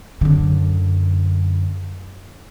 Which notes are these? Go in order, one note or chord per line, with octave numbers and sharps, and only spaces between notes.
F#2 D3